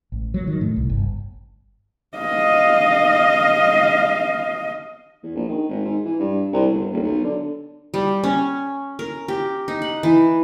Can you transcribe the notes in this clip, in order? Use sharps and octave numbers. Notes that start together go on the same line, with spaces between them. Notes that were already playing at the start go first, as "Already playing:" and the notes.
A1
F#3
D#3
A2
C2
G1
D#5 F5
E2
A#1
D#3
G#1
G#2
E3
G2
C2
G1
D#1
B1
D3
G3
C#4
A#4
G4
D#4
F#5
E3